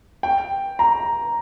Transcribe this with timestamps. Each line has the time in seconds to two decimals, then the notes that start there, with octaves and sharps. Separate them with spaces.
0.23 G5
0.79 A#5